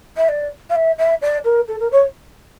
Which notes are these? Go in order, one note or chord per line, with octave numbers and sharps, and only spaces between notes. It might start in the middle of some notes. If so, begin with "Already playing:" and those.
E5
D5
F5
E5
E5
D5
A#4
A4
A#4
C#5